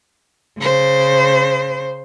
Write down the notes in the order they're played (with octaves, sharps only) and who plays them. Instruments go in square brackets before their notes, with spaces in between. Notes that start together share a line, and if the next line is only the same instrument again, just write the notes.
[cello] C#3 C5